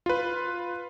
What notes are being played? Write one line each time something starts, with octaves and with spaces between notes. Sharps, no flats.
F4 B4